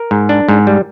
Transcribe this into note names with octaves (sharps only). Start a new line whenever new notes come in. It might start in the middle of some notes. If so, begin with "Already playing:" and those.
Already playing: A#4
G#2
D4
G#2
G3